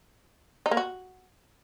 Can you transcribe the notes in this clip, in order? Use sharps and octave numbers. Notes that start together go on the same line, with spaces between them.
D#4
A#3
F#4